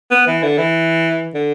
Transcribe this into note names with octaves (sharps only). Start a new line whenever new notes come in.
B3
E3
D3
E3
D3